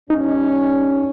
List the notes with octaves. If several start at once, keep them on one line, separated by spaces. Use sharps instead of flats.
G2 C#4 D#4